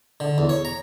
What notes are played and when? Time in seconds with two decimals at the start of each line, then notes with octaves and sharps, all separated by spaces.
0.20 D3
0.38 E2
0.49 C#5
0.65 A#5